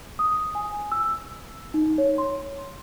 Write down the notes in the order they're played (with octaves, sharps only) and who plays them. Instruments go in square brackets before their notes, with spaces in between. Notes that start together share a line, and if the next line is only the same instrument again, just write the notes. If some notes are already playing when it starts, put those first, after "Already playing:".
[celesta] D#6
G#5
E6
D#4
C#5
C6